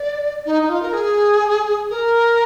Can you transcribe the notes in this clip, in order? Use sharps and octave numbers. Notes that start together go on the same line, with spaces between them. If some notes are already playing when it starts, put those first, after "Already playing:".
Already playing: D5
D#4
D#4
F4
A#4
G#4
A#4